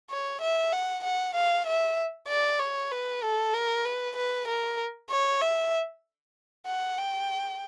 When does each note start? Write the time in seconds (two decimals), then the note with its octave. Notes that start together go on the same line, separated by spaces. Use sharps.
0.10 C#5
0.41 E5
0.73 F#5
1.04 F#5
1.35 F5
1.67 E5
2.29 D5
2.60 C#5
2.92 B4
3.23 A4
3.54 A#4
3.85 B4
4.17 B4
4.48 A#4
5.10 C#5
5.42 E5
6.66 F#5
6.98 G5